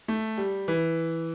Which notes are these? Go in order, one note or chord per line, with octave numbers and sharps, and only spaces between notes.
A3
G3
E3